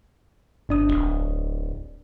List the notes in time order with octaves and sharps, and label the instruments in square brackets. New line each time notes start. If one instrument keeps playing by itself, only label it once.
[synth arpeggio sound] G1 D4 D#6
[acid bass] D1